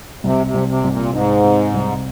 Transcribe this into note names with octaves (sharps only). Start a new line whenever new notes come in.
C2 C3
C3
C2
C3
C2 G#2
A#2
G#2 D#4
C3
C2